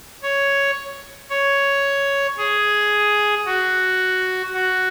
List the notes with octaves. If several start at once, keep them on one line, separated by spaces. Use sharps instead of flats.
C#5
C#5
G#4
F#4
F#4